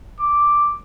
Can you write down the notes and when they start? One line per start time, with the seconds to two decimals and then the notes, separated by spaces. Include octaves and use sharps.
0.19 D6